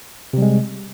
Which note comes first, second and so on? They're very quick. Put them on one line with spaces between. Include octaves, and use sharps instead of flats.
C3 G3 G#3